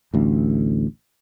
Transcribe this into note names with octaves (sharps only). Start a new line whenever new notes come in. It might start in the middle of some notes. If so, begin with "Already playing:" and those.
A1 D2